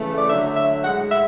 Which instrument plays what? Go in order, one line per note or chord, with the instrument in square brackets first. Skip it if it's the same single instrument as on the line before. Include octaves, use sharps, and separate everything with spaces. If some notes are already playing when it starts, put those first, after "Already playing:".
Already playing: [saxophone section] C#3 E3 A3
D5
D3 F#3 A3 E5
E5
A2 G#3 F#5
E5